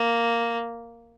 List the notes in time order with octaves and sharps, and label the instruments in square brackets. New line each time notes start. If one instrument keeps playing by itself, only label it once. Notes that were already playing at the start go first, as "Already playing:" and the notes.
Already playing: [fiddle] A#3